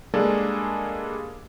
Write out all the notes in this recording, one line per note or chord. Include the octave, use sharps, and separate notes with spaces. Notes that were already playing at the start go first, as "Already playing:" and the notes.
G3 G#3 A#3 D4 G#4 A4